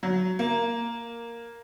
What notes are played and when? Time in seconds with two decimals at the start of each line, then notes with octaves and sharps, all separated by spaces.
0.03 F#3
0.39 A#3